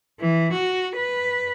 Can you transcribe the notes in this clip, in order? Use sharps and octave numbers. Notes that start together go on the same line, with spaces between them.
E3
F#4
B4